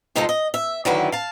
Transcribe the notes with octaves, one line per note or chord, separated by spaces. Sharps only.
C3 G#3 D#4 F4 A4
D#5
E5
D3 D#3 F#3 E4 B4
F5 A5